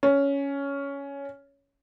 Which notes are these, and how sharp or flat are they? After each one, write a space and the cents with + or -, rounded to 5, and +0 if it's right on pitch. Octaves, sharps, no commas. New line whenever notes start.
C#4 +10